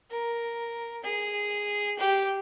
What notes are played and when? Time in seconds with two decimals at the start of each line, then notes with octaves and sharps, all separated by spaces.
0.10 A#4
1.04 G#4
1.98 G4